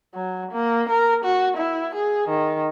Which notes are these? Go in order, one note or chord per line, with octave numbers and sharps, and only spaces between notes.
F#3
A#3
A#4
F#4
E4
G#4
D#3